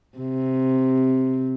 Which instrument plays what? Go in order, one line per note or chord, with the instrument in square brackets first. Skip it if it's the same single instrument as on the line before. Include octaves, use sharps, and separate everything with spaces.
[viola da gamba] C3